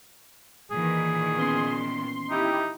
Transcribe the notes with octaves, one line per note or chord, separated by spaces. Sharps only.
A#2 D#3 E3 G#4
B3 C#4 C6
D#4 E4 G4